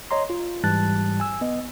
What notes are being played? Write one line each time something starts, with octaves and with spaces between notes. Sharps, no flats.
C#5 D#5 A#5 C6
F4
G#2 E3 G3 A5 F#6 A6
G#5 E6
B3 D#5